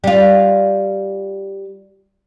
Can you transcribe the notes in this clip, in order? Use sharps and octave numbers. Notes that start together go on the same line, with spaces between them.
G3 F4